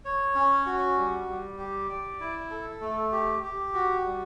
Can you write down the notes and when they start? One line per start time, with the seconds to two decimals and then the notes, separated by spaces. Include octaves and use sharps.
0.05 C#5
0.35 C#4
0.66 F#4
0.97 G3
1.28 G3
1.58 G4
1.89 D5
2.20 E4
2.51 A4
2.81 A3
3.12 G4
3.43 G4
3.74 F#4
4.05 G3